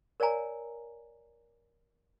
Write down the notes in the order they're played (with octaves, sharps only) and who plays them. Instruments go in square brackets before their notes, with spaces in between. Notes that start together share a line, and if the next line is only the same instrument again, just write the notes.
[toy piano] A#4 C#5 D5 F5 G#5 A#5